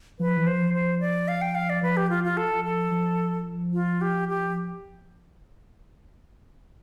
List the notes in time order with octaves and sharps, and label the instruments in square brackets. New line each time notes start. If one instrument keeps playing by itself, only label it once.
[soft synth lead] F3 [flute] B4
[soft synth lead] E3
[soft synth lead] F3 [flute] C5
[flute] C5
D5
F5
G5
F5
D5
[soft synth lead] F3 [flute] B4
[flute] G4
F4
F4
A4
A4
[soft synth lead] F3
[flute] F4
G4
G4